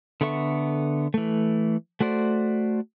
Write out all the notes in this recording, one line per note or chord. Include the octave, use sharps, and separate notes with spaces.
D3 B3 A4 E5 C#6
E3 A3
A3 F#4 C5 D5